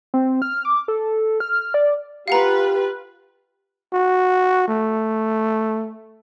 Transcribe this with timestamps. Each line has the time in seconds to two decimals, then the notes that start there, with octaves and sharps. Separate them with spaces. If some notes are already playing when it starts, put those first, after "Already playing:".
0.14 C4
0.42 F6
0.65 D6
0.88 A4
1.40 F6
1.74 D5
2.28 F4 G4 B4 F5 F#5 A#5
3.93 F#4
4.68 A3